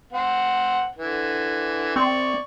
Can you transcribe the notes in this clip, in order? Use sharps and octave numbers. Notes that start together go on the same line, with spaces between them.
C4 F#5
D3 E3
C4 D5 C#6